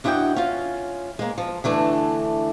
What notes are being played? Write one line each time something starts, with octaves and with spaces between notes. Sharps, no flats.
F#2 D4 E4 D#5 F#5 G5
C#4 F4
G#3 A#3
F3
D3 E3 A3 D4